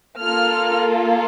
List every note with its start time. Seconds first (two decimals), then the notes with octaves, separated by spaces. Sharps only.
0.21 A#3 F4 A4 F6